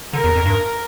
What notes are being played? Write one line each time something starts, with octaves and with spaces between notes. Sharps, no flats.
D3 A#4
E2
F2
G2